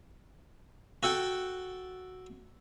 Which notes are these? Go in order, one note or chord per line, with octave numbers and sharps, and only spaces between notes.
F#4 A4 F#5 G5